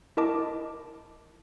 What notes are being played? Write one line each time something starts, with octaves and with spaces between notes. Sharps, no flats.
E4 A#4 D#5 A5 D6